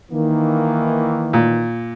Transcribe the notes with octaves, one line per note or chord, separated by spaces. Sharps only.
D#3 E3 A#3
A#2